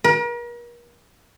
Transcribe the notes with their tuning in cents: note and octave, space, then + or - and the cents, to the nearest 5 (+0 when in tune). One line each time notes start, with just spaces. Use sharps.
A#4 +40